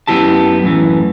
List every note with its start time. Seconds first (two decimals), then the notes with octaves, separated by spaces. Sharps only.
0.07 F#2 B3 E4 G4 A5
0.63 F#2 A2 D#3 E3